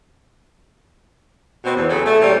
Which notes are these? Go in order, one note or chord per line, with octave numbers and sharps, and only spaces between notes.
B2 C4
E2
C#3 F#3 G#4 A4
A3
A#2 G3 C4 C#4